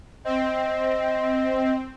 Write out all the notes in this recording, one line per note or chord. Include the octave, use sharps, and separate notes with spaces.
C4 D#5